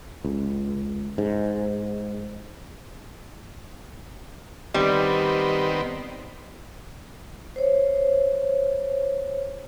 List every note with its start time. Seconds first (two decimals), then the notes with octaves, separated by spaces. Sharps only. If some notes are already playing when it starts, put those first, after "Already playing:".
0.25 C#2
1.18 G#2
4.74 D#3 G3 B3 C4
7.56 C5 C#5